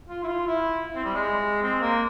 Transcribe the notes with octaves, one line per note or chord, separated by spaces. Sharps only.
F4
E4
F4
E4
C4
G3
G#3
C4
A#3